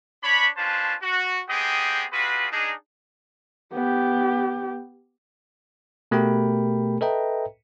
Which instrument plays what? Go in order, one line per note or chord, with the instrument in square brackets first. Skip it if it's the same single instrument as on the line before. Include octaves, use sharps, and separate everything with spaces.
[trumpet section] D4 C#5 B5
C#4 D4 F4 B4 C5 A5
F#4
B3 C4 G4 G#4 D#5 G5
G3 F4 F#4 G#4 B4
D4 D#4 G#4
[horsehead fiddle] B3 G4
[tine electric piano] B2 A3 G4 A#4 G5 B5
A4 B4 D#5 E5 G5 A#5